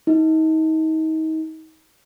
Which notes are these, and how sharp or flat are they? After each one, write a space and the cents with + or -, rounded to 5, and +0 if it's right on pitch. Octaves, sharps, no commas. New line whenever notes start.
D#4 +35